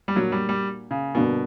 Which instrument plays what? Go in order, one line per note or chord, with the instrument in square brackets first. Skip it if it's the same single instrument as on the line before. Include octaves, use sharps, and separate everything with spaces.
[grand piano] G3
[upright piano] A#2 A#3 D4 F#4 [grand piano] F#3
[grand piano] G3
G3
C#3
[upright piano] G2 D3 A#3 D4 F#4 [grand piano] B2